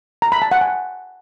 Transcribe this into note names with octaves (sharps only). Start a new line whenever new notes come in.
A#5
B5
A5
F#5
G#5